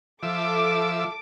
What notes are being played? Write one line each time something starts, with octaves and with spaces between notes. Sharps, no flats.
F3 A4 E5 D6